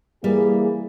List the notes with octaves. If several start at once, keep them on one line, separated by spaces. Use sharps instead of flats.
E3 G3 A#3 G#4